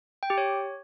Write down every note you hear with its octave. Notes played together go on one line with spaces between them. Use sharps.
G5
G4
C#5